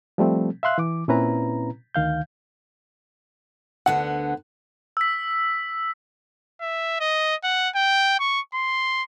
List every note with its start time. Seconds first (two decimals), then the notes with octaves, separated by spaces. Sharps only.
0.18 F3 G3 A3 C4
0.63 E5 F5 C6 F#6
0.78 E3 D6
1.08 A#2 C4 C#4 E4 B4 A#5
1.95 D2 D#3 F5 G6
3.86 D2 D3 B3 F#5
4.97 E6 B6
6.61 E5
7.00 D#5
7.44 F#5
7.76 G5
8.20 C#6
8.54 C6